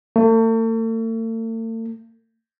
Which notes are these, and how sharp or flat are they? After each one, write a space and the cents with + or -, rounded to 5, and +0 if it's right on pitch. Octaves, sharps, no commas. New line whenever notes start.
A3 +45